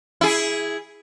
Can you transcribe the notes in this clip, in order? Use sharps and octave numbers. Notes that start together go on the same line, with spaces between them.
E4 G#4